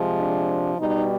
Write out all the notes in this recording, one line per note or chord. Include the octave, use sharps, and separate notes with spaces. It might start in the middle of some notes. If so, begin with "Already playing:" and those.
Already playing: C3 F3 G#3
D4
B2 G3 D#4